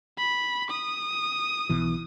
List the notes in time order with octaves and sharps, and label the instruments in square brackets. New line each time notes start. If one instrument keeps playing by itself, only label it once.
[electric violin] B5
D#6
[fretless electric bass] B1 B2 E3